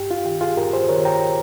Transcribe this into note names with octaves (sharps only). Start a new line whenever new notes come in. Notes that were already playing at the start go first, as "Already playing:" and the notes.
Already playing: G2 G4
F4
D#3 G4
F4 G#4
G2 G4 A#4
G#4 C5
D#3 A#4 C#5
G5 A#5